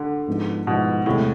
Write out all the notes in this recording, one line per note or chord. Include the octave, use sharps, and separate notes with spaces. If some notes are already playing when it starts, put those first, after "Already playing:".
Already playing: D3
G#2 F3 B3 E4
G#2 B2 F3 B3 E4
E2 A2 C3 G#3